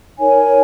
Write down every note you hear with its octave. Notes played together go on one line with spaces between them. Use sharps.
D#4 A#4 C#5 G#5